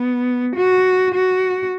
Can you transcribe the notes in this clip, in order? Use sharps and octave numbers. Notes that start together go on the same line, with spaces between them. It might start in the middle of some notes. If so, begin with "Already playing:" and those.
Already playing: B3
F#4
F#4